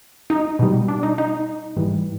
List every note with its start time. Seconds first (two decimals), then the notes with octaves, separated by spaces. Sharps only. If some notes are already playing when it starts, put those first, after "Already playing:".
0.30 D#4
0.59 B2 G3
0.88 D4
1.03 D#4
1.18 D#4
1.76 G#2 E3 G3